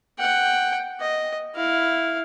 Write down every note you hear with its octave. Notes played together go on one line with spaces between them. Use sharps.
F#5 G5
D#5
E4 F5